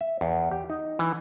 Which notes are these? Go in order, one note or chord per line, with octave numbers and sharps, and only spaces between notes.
E5
E2
G4
D#4
E3